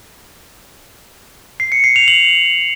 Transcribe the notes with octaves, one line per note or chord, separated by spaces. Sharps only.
C7
C#7
C7
F7
F#7